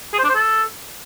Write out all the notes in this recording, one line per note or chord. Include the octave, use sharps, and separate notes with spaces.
G#4
C5
D4
C5
A4